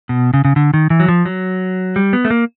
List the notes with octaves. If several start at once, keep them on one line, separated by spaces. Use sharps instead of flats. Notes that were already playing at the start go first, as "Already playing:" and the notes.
B2
C#3
C#3
D3
D#3
E3
F#3
F3
F#3
G3
B3
A3
A#3